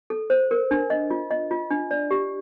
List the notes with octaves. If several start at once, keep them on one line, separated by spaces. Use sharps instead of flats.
A4
C5
A#4
D4
D#5
F4
D#5
F4
D4
D5
G4